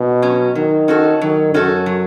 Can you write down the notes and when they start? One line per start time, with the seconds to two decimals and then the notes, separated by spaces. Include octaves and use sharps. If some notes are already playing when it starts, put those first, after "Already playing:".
Already playing: B2
0.22 F#3 C#4
0.55 D#3 F#3
0.88 C#4 F#4 A4
1.21 D#3 F#3
1.53 F#2 C#4 F#4 A4
1.86 F#3